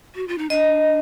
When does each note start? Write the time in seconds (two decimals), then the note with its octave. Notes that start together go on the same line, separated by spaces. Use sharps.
0.15 F#4
0.28 F4
0.38 D#4
0.50 D4 D#5